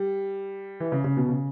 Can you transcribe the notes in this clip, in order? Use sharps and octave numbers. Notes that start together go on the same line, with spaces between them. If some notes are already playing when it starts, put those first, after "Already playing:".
Already playing: G3
E3
C#3
C#3
B2
C#3